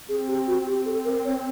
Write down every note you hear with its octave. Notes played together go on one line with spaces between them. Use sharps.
C4 G#4
G4
F#4
G4
A4
A#4
C#5